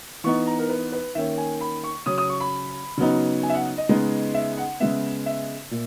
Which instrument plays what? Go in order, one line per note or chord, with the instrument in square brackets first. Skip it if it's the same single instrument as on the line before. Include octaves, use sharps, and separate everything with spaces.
[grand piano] E3 B3 D#4 C#6
A#5
A#4
B4
B4
D#3 A#3 C#4 E5
G#5
B5
C#6
C#3 F#3 C#4 D#6
D#6
C#6
B5
C#3 F#3 B3 D#4
G#5
E5
F#5
D#5
C#3 G#3 B3 D#4 D#5
E5
F#5
C#3 G#3 B3 E5
E5
A#2